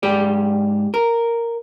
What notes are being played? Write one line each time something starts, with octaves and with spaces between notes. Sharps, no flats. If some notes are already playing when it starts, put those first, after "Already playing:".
G#2 G4 D5
A#4